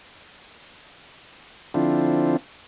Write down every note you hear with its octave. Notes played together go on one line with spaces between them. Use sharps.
D3 F3 C4 D4 E4 F4